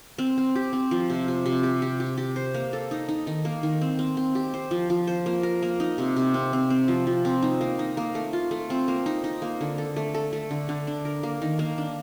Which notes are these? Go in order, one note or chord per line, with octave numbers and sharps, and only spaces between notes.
C4
C4
G4
C4
F3
C3
C3
C3
G4
G4
G4
G4
C5
A#3
A4
D#4
D#4
D#3
A#3
D#3
C4
C4
C4
G4
C5
F3
F3
C5
A#3
A#4
A#3
D#4
C3
C3
C4
C4
C4
F3
F3
C4
D#4
A#3
D#4
A#3
A3
F4
A3
C4
A#3
D#4
D#4
A#3
D3
A4
A3
A4
A3
D3
D3
D4
A#4
A#3
D#3
A#3
D4